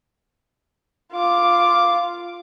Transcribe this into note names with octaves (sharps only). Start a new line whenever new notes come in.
F4 D6